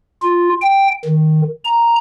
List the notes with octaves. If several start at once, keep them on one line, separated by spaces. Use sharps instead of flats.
F4
G5
D#3
A#5